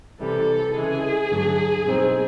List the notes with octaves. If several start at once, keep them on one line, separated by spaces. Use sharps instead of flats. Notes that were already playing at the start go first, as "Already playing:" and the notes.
C3 E3 G3 A4
C#3 E3 G#3 G#4
G2 D3 F#3 A3 D4
B2 G3 C4 D#4